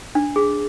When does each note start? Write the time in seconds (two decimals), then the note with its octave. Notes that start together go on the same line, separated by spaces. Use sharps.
0.15 D4
0.36 G#4